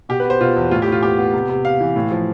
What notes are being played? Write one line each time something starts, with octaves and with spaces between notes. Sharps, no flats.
B2 G4
B4
B3 C5
B2 F4
E2
A2 F4
G4
A2
F4
B3 G4
B3
C3
C3
C3 F5
E3
A2
F3